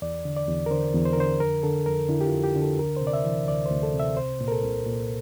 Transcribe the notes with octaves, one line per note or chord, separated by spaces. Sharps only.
E2 D5
D3
D5
E2
A#4
D3 C5
E2
C5
A#4
D3 C5
F2 A#4
D3 A4
F2 A#4
D3 E4
G4
F4
F2
G4
D3
A4
D2 A#4
C3 C5
D5
E5
E3
D2 D5
D2 C5
A4
C3
E5
C2 C5
A#2
A#4
A4
C2
A#2